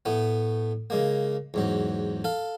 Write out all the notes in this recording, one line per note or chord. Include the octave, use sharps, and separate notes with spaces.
A2 A3 B3
C#3 G#3 A#3
E2 G#2 F#3
A4 F5